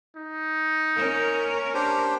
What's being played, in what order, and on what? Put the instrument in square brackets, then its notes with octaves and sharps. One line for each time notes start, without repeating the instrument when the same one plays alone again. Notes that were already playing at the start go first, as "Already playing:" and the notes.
[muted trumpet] D#4
[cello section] A#3 C#4 A#4
[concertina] D4 G4 C5